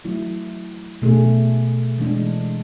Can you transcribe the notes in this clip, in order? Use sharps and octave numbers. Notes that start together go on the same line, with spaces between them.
F#3 A3 E4
B2 A3 D4 G#4
E3 G#3 D4